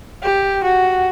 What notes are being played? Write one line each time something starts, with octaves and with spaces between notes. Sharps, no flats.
G4
F#4